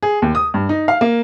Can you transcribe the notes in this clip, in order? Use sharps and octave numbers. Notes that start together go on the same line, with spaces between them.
G#4
D#2
D#6
G2
D#4
F5
A#3